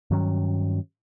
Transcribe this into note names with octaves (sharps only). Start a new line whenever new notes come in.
G2 D#3 F#3 C#4